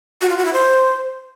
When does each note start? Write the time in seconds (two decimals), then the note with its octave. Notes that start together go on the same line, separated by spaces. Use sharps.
0.22 F#4
0.29 F4
0.37 F#4
0.45 E4
0.53 C5